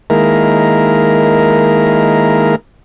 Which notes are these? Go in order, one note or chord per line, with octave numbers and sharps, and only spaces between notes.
D#3 G#3 A#3 E4 A#4